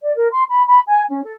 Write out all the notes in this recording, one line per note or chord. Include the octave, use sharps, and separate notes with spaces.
D5
A#4
C6
B5
B5
G#5
C#4
A4